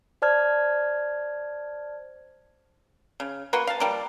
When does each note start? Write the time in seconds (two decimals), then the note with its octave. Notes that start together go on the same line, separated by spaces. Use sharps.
0.22 C5 D5 A5 F6 G#6
3.20 C#3
3.53 A#3 F#4 B4 C6
3.67 F5 A5
3.80 F3 G3 A#3